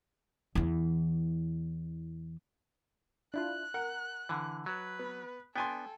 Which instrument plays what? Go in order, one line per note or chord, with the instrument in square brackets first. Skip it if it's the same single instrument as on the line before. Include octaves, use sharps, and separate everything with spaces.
[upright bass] E2 E3
[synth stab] D4 E4 F4 [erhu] F#6
[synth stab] A#4 [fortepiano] F#5
[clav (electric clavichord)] D3 E3
[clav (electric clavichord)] F#3 [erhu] B4
[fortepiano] B3
[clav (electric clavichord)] B3 D4 [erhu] A4 [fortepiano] G5 G#5 C6